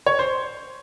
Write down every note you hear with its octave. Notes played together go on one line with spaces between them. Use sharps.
C#5
C5